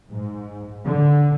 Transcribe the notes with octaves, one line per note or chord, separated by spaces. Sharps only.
G#2
D3